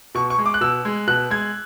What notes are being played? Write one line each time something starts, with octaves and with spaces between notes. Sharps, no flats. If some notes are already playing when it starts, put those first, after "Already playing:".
B2 C#6
C#6
G#3
D6
F#6
B2 E6
G#3
B2 F#6
G#3 G#6